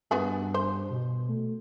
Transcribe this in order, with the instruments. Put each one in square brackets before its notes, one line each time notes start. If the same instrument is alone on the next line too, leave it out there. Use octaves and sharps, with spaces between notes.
[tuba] G2 [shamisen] B3 F#4 G#4
[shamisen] C5
[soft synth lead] B2
[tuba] A3